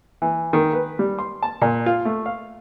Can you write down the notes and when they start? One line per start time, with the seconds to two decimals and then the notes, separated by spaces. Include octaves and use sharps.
0.22 E3
0.53 D#3
0.73 B4
0.99 G3
1.19 C6
1.43 A5
1.62 A#2
1.86 F4
2.05 A3
2.26 F5